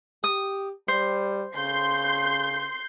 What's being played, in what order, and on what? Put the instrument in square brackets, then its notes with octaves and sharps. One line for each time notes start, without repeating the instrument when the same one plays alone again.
[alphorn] G4 [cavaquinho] D#6
[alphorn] G3 [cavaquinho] C5
[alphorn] C#3 [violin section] C6 G6 C7